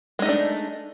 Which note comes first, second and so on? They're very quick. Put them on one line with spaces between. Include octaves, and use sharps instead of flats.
G#3 D#4 A3 D4